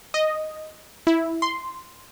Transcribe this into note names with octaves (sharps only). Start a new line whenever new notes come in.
D#5
E4
C6